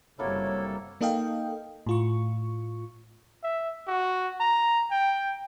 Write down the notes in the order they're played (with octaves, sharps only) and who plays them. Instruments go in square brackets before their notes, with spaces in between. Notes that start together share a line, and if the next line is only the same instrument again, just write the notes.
[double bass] F#1 G3 [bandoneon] C3 A4 [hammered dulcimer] F#3 A#3 E4 [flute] C#5
[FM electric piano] A#3 D#4 A4 D#5 F5 G5
A2 F4 C#6
[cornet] E5
F#4
A#5
G5